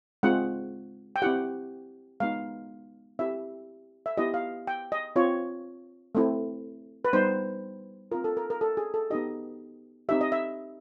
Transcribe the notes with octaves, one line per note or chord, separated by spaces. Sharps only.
G#3 C4 F4 F#5
G5
C4 E4 G4 F#5
G#3 B3 D#4 F5
C4 E4 G4 E5
E5
B3 E4 G4 D#5
F5
G5
D#5
C4 F4 C#5
A3 C4 E4
B4
G3 B3 D#4 C5
C4 F4 A#4
A4
A#4
A#4
A4
G#4
A4
B3 D#4 G4 D#5
C4 D#4 G4 E5
D#5
E5